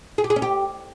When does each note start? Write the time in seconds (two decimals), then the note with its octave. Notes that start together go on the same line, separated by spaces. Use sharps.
0.18 G#4
0.24 G4
0.30 G#4
0.36 C#4
0.42 G4